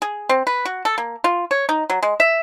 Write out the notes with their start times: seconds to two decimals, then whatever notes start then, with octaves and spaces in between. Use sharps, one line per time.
0.02 G#4
0.29 C4
0.47 B4
0.65 F#4
0.85 A4
0.98 A#3
1.24 F4
1.51 C#5
1.69 D#4
1.90 F#3
2.03 G#3
2.20 E5